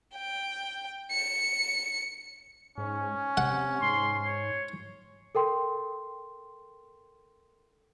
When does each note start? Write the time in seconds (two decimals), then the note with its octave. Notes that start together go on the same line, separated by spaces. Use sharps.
0.15 G5
1.11 C#7
2.78 G#2 C#4
3.37 C3 F#5
3.82 G#2 C6
4.26 C#5
5.35 A4 A#4 G5 C6